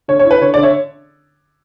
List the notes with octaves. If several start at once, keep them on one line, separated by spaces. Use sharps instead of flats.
D3 C#5
C#5
E4
B4
D3 C#5
D3 D5
C#5 E5